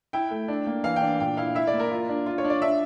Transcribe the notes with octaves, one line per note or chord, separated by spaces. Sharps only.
E4 G5
A3
D4
A#3
E3 F5
G5
D4
A#2 G5
E4 F5
E4 E5
D5
A#3
A#4
F4
D4
F4
C#5
D4
D5
D4 E5